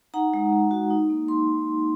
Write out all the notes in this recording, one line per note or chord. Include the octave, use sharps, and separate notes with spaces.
D#4 F#5 A#5
G#3
G#3
F#4
D#4
A#3
C6